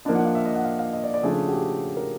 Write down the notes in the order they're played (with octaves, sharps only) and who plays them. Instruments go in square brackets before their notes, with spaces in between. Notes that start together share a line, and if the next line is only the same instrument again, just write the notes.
[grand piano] F3 A#3 D4 D#5
F#5
F5
E5
D#5
F#5
F5
F5
D#5
D5
D5
C#3 F3 A3 D4 G#4
F#4
G4
A#4